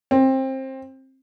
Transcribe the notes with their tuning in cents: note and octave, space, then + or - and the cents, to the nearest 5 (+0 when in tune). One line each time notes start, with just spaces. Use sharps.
C4 +20